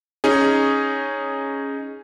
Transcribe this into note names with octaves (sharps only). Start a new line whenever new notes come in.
C#4 D#4 G#4